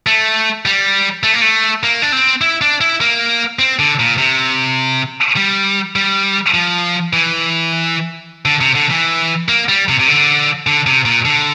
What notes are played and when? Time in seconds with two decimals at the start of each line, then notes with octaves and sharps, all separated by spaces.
0.07 A3
0.66 G3
1.23 A3
1.34 A#3
1.42 A3
1.83 A#3
2.02 D4
2.12 C4
2.41 E4
2.61 D4
2.81 E4
3.01 A#3
3.59 C4
3.79 D3
4.00 A#2
4.18 C3
5.37 G3
5.96 G3
6.54 F3
7.13 E3
8.45 D3
8.61 C3
8.75 D3
8.91 E3
9.49 A#3
9.69 G3
9.89 C3
10.00 C3
10.08 D3
10.67 D3
10.87 C3
11.05 A#2
11.25 D3